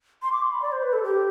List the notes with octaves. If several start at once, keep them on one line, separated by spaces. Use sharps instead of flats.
C6
D6
C6
B5
D5
C5
B4
A4
G4